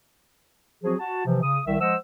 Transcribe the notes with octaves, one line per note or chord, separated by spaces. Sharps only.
F3 F#3 C4 F#4 G#4
F#4 A5
C3 E3 F3
C#3 D#6
C2 D#3 E5
F3 G#3 C5 D#5 F#5 E6